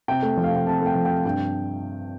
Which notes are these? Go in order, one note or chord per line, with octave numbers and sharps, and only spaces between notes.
C3 G5
A3
F3
F5
C3 G5
C3 A5
A3 G5
F3
G5
C3
G2 G5